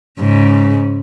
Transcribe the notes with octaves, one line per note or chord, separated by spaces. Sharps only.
G#2 C#3